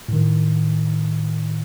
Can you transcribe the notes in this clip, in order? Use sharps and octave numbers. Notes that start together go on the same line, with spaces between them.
A2 D#3